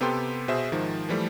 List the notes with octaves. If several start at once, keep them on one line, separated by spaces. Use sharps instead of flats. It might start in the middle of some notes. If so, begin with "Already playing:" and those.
C3 B3 G4 A4 G5 C6
B2 G#4 C5 E5
G#2 D#3 F3
E3 F3 G3 A3